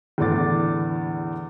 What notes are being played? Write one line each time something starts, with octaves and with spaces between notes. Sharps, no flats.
E2 A2 D3 D4 D6 A6